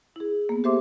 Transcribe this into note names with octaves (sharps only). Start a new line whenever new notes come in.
E4 G#4
A#3 B3
G4 A4 C5 E5 C6 D6